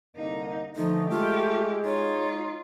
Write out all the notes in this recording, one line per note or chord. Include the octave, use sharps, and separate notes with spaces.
C2 D3 A#3 D#4
D3 E3 F3 A3 D#4
G#3 A3 F4 G4
D#4 F4 C#5